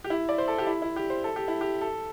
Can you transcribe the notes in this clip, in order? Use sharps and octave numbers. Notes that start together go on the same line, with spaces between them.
G4
E4
D5
C5
A4
G4
E4
E4
G4
C5
A4
G4
E4
G4
A4